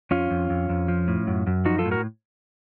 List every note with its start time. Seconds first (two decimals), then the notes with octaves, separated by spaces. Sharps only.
0.11 F2 C#4 F4
0.31 F2
0.50 F2
0.69 F2
0.88 F3
1.08 A2
1.27 F#2
1.47 F#2
1.65 F3 D#4 F#4
1.78 F4 A4
1.85 A2
1.91 F#4 A#4